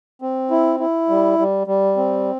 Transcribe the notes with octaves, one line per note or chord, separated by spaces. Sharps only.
C4
E4
E4
G3
G3
G3
C4